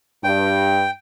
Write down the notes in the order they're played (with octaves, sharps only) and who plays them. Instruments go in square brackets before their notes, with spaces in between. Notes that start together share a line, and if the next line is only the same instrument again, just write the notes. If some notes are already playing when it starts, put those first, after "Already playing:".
[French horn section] G2 [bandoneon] G5